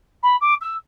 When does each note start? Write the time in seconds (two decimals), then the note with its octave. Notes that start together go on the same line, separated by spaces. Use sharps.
0.23 B5
0.41 D6
0.61 E6